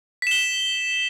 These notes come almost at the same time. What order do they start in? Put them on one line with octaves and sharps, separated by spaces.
B6 E7 G7